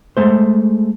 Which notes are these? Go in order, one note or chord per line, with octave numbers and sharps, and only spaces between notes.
G#3 A3 C5